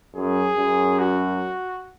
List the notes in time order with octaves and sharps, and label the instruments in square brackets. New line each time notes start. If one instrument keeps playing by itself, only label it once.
[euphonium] F#2 [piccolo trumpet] G#4
[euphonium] F#2
[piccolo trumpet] F#4